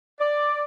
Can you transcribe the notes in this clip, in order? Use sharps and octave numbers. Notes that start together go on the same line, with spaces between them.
D5